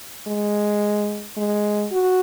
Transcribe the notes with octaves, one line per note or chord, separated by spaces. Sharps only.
G#3
G#3
F#4